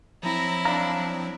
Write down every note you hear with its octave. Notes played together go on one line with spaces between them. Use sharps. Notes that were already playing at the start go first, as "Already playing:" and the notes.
F3 F#3 C4 E4 A#5
D4 F5 A#5